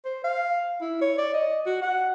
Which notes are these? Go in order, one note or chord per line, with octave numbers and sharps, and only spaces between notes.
C5
F5
E4
C#5
D5
D#5
F#4
F#5